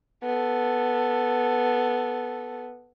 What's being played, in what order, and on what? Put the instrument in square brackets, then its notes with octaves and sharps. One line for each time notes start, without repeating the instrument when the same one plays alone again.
[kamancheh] B3 A4